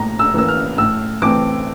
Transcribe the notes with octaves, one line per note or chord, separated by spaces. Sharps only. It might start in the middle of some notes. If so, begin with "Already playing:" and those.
Already playing: A2 A#3 A#5
E6
E3 A#3 E6
F6
A2 E6
E3 A3 C4 D6